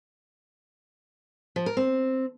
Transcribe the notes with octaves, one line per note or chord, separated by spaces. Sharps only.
F3
A#4
C4